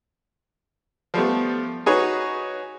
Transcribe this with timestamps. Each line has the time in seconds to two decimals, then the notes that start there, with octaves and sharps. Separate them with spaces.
1.14 F3 G3 A3 B3
1.86 D#4 F#4 G#4 B4 C#5